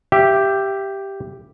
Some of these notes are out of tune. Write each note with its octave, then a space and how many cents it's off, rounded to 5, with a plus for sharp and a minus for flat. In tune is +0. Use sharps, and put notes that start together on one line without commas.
G4 +0 E5 +25